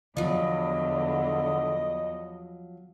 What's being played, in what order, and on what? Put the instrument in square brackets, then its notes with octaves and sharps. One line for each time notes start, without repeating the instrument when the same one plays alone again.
[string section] E2 [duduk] D3 [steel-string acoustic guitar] F3 F#3 [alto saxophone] D#5